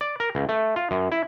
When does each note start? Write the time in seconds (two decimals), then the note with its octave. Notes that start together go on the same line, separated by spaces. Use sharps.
0.01 D5
0.20 A#4
0.35 C#2
0.49 A3
0.76 F4
0.91 F#2
1.12 E4